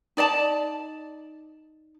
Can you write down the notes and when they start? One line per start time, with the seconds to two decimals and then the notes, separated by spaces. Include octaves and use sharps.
0.17 D#4 D5 D#5 A5